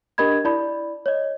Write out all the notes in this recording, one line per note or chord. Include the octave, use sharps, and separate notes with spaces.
D4 G4 A#4 D#5 B5 G#6
E4 D5 B5
C#5 D#5